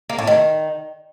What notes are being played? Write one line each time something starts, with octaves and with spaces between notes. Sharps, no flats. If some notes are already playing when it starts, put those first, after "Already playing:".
A#3
A2
D#3